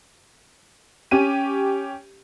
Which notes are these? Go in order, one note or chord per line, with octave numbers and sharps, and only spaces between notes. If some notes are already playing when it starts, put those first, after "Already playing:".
C#4 G4 D#7